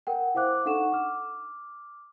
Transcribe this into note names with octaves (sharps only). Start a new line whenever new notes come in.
A#4 F#5 G5
E4 C5 F5 D6 F#6
D4 D#4 A4 F#5 C#6 E7
D6 F6